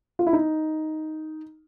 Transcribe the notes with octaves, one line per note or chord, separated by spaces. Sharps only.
F4
E4
D#4